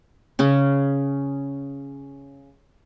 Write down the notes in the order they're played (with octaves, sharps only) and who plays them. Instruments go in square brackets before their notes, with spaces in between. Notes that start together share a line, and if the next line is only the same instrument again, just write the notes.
[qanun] C#3 C#4 G#4